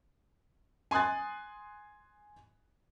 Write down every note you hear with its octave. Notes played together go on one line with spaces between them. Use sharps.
G#5 C6 D#6 F#6 A6